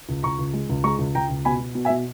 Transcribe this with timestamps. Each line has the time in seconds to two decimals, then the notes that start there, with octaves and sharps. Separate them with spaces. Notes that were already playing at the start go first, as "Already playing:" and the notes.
0.09 C#2
0.23 C#2 A#5 C#6
0.39 C#2
0.53 G#3
0.69 C#2
0.84 G#3 A#5 C#6
0.99 C#2
1.15 C#2 G5 A#5
1.29 C#2
1.45 B2 G#5 B5
1.60 B2
1.75 B2
1.85 E5 G#5
1.90 B2